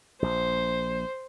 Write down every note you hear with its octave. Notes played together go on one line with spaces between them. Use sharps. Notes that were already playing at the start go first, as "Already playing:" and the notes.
A#1 C5